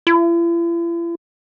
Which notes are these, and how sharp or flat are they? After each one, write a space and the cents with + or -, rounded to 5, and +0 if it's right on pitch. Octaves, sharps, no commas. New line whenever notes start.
E4 +45